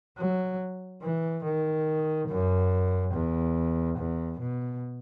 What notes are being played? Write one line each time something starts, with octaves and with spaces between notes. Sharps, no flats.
F#3
E3
D#3
F#2
E2
E2
B2